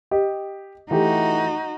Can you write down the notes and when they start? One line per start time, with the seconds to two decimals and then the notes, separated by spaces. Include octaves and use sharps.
0.11 G4 D#5
0.91 E3 A3 D#4 F#4 G4